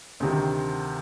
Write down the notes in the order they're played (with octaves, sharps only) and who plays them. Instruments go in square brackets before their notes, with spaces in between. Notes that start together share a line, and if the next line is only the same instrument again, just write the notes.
[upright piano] D2 C3 D#3